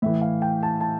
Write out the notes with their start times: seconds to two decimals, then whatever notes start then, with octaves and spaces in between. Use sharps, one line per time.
0.02 A2 E3 E5
0.22 F5
0.42 G5
0.63 A5
0.81 A5